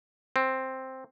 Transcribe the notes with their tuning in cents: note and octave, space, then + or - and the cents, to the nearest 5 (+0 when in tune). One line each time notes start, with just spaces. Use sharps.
C4 +5